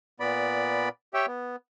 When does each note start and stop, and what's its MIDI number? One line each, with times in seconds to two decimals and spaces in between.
0.20 0.89 46
0.20 0.89 59
0.20 0.89 74
0.20 0.89 83
1.14 1.26 67
1.14 1.26 73
1.14 1.26 76
1.14 1.26 79
1.27 1.56 59